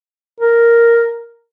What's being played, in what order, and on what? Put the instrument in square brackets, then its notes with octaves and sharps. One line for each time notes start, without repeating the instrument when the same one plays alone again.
[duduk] A#4